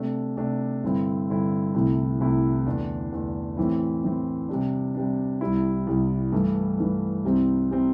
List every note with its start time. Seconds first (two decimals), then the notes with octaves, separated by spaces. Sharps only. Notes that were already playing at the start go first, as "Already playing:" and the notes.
Already playing: C3 A3 D4
0.37 C3 A3 D4
0.83 G2 D3 C4 E4
1.29 G2 D3 C4 E4
1.74 C2 C3 A3 E4
2.20 C2 C3 A3 E4
2.66 E2 D3 A3 D4
3.12 E2 D3 A3 D4
3.57 A2 E3 C4 E4
4.03 A2 E3 C4 E4
4.49 C3 G3 D4
4.95 C3 G3 D4
5.41 C2 C3 G3 E4
5.87 C2 C3 G3 E4
6.32 G2 E3 A3
6.78 G2 E3 A3
7.24 C2 C3 G3 C4
7.71 C3 G3 C4